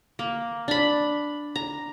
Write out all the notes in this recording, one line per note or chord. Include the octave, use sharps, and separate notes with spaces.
A#3
D4 B5
A#5